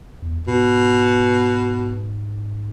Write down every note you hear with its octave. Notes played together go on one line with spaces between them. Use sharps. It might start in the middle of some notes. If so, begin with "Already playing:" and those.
E2
G#2 B2